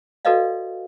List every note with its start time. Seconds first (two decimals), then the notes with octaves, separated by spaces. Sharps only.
0.25 F#4 A4 B4 D5 D#5 F5